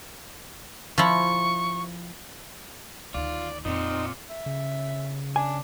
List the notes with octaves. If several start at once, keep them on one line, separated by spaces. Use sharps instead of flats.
F3 E4 C#6
D2 D#3 F4 D5
F2 A#2 C4 D#4
E5
C#3
D4 G#5